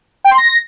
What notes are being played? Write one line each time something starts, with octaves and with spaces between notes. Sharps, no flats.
G5
C6
A#6